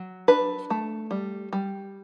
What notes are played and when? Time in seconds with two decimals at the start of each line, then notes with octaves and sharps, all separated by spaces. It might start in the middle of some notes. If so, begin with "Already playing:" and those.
Already playing: F#3
0.28 D4 B4
0.70 A3
1.11 G3
1.53 G3